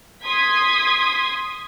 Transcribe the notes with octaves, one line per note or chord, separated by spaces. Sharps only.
C6 D#6 G#6 B6